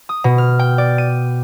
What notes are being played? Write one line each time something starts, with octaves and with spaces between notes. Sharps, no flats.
D#6
B2
F6
G5
D5
D#7